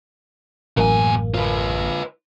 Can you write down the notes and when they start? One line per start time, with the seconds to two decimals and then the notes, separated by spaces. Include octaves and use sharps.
0.77 A1 F#2 B2 A#3 G#5
1.35 F4 B4